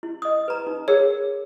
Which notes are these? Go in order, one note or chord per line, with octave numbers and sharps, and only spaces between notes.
E4
D#5 D#6
B4 A#5
D#4
G#4 A#4 C#5